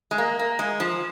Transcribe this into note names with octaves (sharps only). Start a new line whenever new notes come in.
G#3
A#3
A#3
G#3
F3